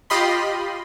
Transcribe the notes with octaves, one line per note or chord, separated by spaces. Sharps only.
F4 G4 D#5 B5 C6